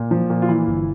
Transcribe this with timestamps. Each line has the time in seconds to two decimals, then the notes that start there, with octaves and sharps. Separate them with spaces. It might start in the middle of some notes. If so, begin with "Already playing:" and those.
Already playing: A#2
0.11 F3
0.30 A#2
0.42 F4
0.48 E3 E4
0.67 G1